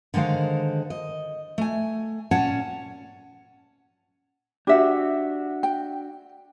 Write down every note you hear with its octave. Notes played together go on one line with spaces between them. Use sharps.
D3 D#3 G#3 C5 F5
D#5
A3 G#5
A#2 C#4 C#5 F#5 G#5 A5
D4 F#4 G4 E5
G5